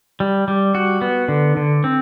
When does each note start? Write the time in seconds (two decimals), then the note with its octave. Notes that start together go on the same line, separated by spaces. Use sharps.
0.20 G3
0.48 G3
0.75 F#4
1.01 B3
1.28 D3
1.57 D3
1.84 C4